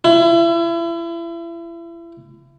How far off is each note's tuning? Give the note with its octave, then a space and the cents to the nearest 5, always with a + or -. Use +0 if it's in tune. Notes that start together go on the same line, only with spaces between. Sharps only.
E4 +35